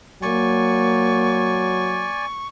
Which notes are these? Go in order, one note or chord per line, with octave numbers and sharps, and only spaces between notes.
F#3 A#3 D5 G#5 C#6